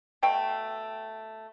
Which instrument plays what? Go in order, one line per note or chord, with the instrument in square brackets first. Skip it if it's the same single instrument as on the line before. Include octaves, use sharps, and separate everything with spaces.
[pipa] B2 A3 G5